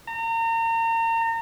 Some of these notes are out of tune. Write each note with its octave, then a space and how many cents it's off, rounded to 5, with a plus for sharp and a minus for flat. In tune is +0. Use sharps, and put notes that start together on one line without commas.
A#5 -35